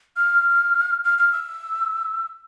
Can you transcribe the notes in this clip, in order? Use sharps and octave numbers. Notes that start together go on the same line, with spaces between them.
F6
F6
F6
E6